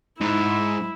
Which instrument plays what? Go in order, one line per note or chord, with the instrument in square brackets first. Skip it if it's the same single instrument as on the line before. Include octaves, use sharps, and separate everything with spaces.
[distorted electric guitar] G#2 [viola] E4